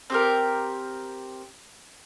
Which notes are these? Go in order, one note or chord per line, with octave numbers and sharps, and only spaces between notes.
C4 G4 A#4